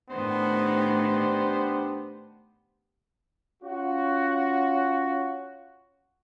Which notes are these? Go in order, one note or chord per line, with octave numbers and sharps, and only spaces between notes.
A2 D#3 B3 D4 G4 C5
C#4 F4 F#4